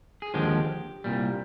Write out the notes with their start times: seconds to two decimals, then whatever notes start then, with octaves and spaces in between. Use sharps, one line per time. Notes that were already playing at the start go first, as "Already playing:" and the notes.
0.22 G#4
0.34 D#2 D3 F3 G#3 G4
1.04 C2 A#2 G3